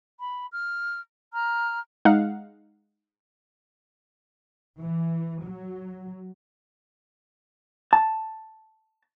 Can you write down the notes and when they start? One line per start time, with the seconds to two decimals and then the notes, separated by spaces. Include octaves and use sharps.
0.19 B5
0.51 F6
1.33 A#5 F6
2.05 G#3 D#4 F5 F#5
4.79 E3
5.43 F#3
7.93 A5